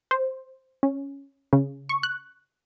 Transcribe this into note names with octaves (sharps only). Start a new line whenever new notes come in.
C5
C#4
C#3
C#6
F#6